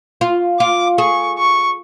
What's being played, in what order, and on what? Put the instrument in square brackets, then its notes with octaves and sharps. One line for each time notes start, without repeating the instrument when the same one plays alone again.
[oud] F4
[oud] F4 [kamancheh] D6
[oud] G#4 [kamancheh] C#6
[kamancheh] C#6